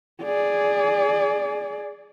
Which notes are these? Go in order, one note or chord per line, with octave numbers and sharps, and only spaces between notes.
G#4 D5